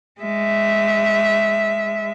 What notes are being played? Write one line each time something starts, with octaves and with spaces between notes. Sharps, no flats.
G#3 E5